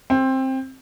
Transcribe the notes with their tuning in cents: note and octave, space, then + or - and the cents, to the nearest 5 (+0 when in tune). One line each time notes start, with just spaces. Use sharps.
C4 +15